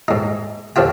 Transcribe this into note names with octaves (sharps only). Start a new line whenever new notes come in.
G#2 D#4
F2 F3 C4 F4 G5